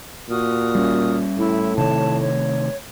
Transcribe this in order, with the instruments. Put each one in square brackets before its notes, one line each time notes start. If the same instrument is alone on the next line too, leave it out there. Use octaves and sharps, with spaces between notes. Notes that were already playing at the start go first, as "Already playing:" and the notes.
[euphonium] A#2 [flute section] F#4 D#6 F6
[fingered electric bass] G3 C#4
[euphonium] A2 [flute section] E4
[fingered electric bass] C3 D#3 A3 [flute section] C#5 A5
[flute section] C#5